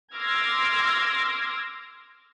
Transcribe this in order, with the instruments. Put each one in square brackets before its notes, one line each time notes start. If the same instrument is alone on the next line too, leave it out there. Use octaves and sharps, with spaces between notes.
[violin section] C6 D6 E6 F6 G#6 A#6